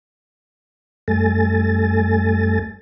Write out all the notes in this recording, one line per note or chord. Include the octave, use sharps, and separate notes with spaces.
F#2 G3 A3 A4 G#5 A6